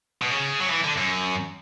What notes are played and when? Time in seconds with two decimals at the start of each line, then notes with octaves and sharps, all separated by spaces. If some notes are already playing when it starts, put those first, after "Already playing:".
0.22 B2
0.31 C#3
0.60 F#3
0.70 E3
0.83 D3
0.96 F#2